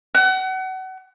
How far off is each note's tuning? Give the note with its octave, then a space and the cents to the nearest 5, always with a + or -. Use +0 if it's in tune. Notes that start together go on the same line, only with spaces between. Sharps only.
F#5 +30